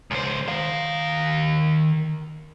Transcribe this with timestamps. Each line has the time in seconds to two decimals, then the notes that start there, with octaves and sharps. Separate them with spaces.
0.11 C#2 C5
0.48 D#3 F5